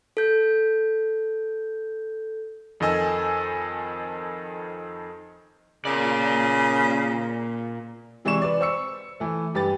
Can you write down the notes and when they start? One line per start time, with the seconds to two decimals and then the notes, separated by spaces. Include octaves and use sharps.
0.17 A4 G6
2.80 F2 D#3 A4 D#5 G#5 E6
5.85 A#2 C#3 A#4 D5
8.25 C3 E3 G#3 D5 C#6 E7
8.42 B4 D5
8.60 C5 C#6 E6 C#7
9.20 E3 A3
9.54 G2 G4 B4 A6